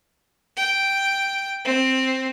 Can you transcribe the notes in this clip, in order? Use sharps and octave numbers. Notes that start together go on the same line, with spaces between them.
G5
C4